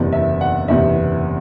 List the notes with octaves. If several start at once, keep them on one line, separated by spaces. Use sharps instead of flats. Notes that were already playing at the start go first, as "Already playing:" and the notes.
Already playing: F#1 E2 C3
E5
F#5
F#1 E2 C3 E5